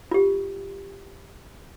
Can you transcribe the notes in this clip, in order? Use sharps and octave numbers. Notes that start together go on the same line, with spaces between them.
F4 G4